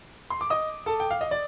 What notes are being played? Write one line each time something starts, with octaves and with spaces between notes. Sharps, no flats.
C6
D6
D#5 D#6
A4 A5
G5
F5
D#5
D5